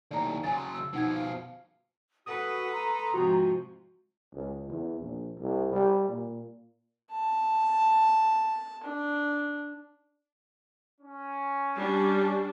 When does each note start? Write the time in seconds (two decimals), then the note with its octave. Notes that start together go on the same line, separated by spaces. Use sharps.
0.11 D#2 A2 D5 A#5
0.44 C#3 F#3 G#5 A6
0.55 C6
0.74 E6
0.94 B2 F3 D#4 F#5 G#6
1.16 F5
2.26 F#4 A4 B4 D#6
2.73 A#5 C6
3.14 G#2 C3 F3 F#4
4.34 C#2
4.69 E2
5.00 A#1
5.37 C2
5.72 G3
6.08 A#2
7.12 A5
8.83 D4
11.01 C#4
11.75 G3 D4